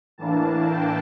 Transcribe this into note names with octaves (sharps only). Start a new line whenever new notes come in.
A2 E3 A#3 D4 A5
G5